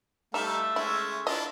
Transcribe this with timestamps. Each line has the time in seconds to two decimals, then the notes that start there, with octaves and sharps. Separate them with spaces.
0.34 G3 A3 D#4 A4 E5 F5
0.76 G#3 C#4 E4
1.27 D4 E4 F4 D#5